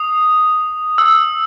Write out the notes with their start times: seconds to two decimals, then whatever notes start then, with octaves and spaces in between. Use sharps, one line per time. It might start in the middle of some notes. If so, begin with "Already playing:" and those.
Already playing: D#6
0.98 E6